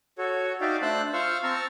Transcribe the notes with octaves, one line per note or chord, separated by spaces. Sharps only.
F#4 A4 C#5
D#4 F#4 D5 E5 F5 G5
A3 D4 C5 A5 E6 F#6
F4 C5 F5 C#6 E6 F6
C4 A5 A#5 C#6 E6 F6